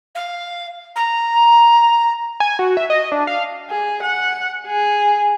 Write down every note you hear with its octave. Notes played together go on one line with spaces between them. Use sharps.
F5
A#5
G#5
F#4
E5
D#5
D4
F5
G#4
F#5
G#4